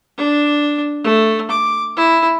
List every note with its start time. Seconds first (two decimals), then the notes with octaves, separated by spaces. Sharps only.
0.18 D4
1.04 A3
1.51 D6
1.97 E4